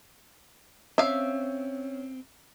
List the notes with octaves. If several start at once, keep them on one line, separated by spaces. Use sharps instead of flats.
C4 C#4 E5 F5